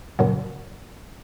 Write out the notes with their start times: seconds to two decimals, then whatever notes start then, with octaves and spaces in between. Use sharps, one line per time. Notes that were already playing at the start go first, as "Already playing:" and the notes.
0.19 F#2 A#2 C#3 F#3